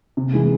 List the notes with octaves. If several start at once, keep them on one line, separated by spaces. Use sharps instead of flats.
C3
E3 G#3